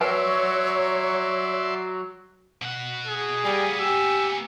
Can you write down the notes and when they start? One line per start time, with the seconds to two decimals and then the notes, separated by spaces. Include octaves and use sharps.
0.01 F#3 B4 C#5 D5 E5 G#5 C6
2.62 B2 F#5
3.07 G#4
3.44 G3 A#3 B3 G#5
3.80 G4 E6